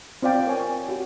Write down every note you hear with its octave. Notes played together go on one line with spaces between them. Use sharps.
C4 F4 D5 F5 G5
A#4 C#5 G#5
F#4 G4